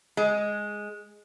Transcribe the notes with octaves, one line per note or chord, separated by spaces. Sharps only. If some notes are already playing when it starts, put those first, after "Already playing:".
G#3